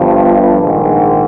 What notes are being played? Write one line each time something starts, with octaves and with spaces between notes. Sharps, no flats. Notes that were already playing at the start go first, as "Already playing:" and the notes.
Already playing: G1 G2 F3
A#1 G#2 D#3